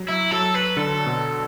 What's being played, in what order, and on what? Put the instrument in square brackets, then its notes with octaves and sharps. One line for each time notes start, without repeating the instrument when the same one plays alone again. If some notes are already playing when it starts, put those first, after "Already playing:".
Already playing: [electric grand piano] F#3
[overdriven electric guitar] E4
[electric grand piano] F#3 [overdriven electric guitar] A4
[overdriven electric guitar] B4
[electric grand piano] D3 [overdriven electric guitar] A4
[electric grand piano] B2